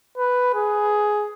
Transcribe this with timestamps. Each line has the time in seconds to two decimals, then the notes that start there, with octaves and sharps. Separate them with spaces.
0.18 B4
0.55 G#4